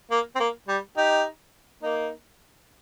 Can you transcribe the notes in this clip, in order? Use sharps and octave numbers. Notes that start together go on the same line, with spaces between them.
A#3
C4
A#3
G3
D#4 G4
A#3 D#4